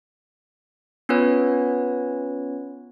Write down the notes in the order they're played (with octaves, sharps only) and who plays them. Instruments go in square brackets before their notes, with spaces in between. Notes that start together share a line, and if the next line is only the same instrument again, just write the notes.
[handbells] B3 C#4 F4 B4 C#5